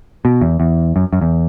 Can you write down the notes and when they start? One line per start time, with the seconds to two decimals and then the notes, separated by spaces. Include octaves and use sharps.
0.25 B2
0.41 E2
0.60 E2
0.96 F#2
1.13 F#2
1.21 E2